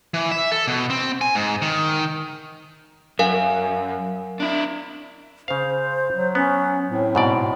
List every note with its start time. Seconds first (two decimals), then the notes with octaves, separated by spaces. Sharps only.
0.14 E3
0.31 E5
0.52 A4
0.68 B2
0.90 C4
1.21 G#5
1.35 G#2
1.62 D#3
3.19 F#2 A#4 F5 G#5
4.40 D4 E4
5.48 C#3 C5 F5
6.13 F#3
6.35 B3 C#4
6.90 A2 C4
7.15 G#2 B2 D5